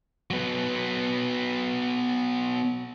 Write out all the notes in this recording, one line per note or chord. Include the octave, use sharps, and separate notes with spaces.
F#3 B3